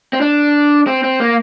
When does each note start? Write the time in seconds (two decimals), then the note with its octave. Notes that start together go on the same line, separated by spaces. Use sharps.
0.13 C4
0.21 D4
0.87 C4
1.04 C4
1.20 A#3